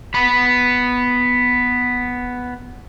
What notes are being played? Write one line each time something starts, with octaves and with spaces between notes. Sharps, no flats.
B3 B5